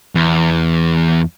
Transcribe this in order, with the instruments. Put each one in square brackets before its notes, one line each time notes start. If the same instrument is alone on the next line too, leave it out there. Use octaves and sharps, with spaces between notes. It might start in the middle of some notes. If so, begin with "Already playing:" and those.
[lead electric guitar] E2